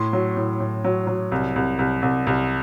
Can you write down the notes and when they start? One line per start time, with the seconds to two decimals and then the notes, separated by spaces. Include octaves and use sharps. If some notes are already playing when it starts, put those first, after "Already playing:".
Already playing: A2 C6
0.13 F#3
0.37 A2
0.60 A2
0.85 F#3
1.07 F#3
1.32 C2
1.56 C2
1.79 C2
2.02 C2
2.27 C2